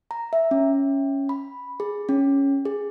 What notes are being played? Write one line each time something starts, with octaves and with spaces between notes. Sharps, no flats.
A#5
E5
C#4
B5
G#4
C#4
G#4